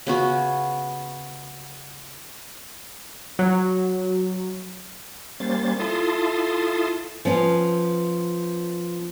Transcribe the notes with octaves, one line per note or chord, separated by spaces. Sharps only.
C#3 B3 F#4
F#3
G3 A#3 C#4 C5 A6
E4 F4 A4 A5 C6 D#6
F3 B3 C#4